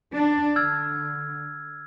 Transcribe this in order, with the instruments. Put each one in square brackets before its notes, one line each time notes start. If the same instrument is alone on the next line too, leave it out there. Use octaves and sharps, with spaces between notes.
[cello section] D4
[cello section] D3 [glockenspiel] E6 F6 G#6